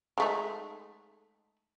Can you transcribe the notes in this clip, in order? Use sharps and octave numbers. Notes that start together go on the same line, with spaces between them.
G#3 A3 D#4